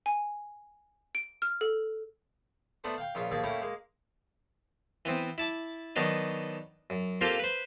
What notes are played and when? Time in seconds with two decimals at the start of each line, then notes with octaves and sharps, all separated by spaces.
0.06 G#5
1.15 D7
1.42 F6
1.61 A4
2.84 A3 B3 D4 B4 C5
2.98 F5 G5
3.15 A#1 C#3 F4 E5
3.31 D#2 F3 A#3 G#4 E5 A5
3.43 A3 A#3 C#4 E4 G4
3.62 G#3 A#3
5.05 E3 B3 C4
5.38 E4 A5 D6
5.96 D#3 F#3 B3 D4 D#4
6.90 F#2
7.21 A#3 C4 F4 G4 A4 A#4
7.39 B4 C5